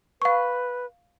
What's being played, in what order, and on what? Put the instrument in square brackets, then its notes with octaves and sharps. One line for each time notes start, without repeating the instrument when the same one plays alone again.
[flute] B4 [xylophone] F5 C#6